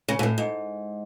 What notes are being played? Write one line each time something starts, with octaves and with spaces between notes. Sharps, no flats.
C#3
B2
A2
G#2